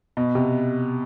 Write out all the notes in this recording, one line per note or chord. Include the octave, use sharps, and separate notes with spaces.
B2
C3